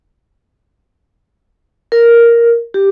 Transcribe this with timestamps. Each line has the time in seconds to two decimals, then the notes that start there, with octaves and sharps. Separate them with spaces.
1.92 A#4
2.74 G4